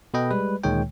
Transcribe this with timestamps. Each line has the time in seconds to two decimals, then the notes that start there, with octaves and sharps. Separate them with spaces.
0.14 B2 A4 B4 D#5 G5
0.31 G3 G#3 B4
0.64 D2 A#2 D#3 G#3 C#5 G5